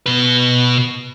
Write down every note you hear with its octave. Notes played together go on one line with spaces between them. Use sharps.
B2 B4